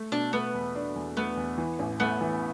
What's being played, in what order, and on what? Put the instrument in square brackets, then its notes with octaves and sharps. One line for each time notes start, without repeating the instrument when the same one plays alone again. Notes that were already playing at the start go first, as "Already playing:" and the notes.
Already playing: [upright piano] A3
[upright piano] B2 [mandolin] D4
[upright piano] A3 [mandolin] B3
[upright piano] E2
D4
E2
[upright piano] A3 [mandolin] B3
[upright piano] E2
E3
A1
[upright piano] A3 [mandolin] B3
[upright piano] E3